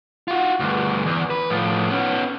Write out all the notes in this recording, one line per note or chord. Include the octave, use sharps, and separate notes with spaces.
F4 F#4
D2 G2
E2
B4
A2 F3
B3 C#4